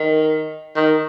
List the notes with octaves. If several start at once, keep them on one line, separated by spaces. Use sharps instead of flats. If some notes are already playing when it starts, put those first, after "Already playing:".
Already playing: D#3
D#3